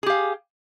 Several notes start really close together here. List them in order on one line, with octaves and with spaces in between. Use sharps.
G#4 G4 F5